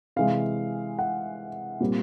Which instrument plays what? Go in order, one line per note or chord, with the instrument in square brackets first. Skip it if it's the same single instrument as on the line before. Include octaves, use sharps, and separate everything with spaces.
[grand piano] C3 E3 G#3 F5
F#5
A#2 G3 C4